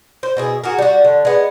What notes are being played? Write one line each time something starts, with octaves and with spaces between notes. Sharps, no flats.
C5
B2 E4 G#4
F#4 G#4 A#4
G3 F#4
D3
G#3 B3